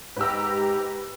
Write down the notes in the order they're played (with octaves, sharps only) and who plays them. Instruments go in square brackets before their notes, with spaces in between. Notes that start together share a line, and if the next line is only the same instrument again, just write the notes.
[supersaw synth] G#2 G4 A#5 [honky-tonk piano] B4 E6